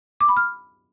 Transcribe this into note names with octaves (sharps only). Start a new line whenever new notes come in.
D6
B5
F6